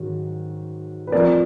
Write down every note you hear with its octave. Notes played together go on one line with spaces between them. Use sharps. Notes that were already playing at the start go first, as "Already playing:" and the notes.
Already playing: G#2 D#3 F#3
B4
F2 F3 A#4 D5